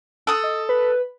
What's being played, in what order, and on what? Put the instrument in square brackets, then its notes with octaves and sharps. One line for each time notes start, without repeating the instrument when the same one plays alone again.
[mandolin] A4 D#6 [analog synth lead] F#6
[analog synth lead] D#5
B4